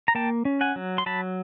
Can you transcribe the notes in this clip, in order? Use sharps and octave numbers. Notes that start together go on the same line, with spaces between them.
A#5
A#3 G5 A5
C#4
F#5 G#5
F#3
C6
F#3 A5 B5